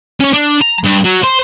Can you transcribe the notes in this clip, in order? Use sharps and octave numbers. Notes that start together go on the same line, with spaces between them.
C#4 C#5
D4
A#5
G2
F#3
C5